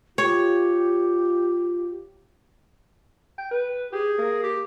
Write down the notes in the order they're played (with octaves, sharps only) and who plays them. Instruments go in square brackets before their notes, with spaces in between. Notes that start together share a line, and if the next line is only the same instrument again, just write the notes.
[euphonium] F4 [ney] G4 [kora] C#5
[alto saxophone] G5
B4
[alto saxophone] G4 [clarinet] G#4
[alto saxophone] A#3
[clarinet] G4